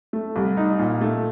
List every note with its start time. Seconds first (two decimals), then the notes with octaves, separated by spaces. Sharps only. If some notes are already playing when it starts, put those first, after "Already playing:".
0.13 A3
0.36 C2
0.57 D#4
0.79 A#2
1.01 A3